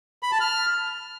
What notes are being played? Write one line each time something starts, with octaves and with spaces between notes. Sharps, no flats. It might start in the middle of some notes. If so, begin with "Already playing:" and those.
B5
A5
F6